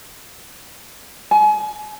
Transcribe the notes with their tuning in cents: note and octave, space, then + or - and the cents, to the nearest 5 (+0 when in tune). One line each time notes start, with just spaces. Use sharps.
G#5 +35